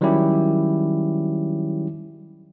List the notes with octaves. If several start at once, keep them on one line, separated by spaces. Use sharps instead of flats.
D#3 F#3 G3 C#4 E4 G4